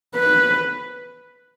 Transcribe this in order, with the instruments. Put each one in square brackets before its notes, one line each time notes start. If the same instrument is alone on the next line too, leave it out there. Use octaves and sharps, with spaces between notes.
[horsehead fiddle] B4